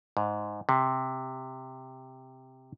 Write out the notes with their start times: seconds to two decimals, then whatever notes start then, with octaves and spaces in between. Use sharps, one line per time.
0.17 G#2
0.69 C3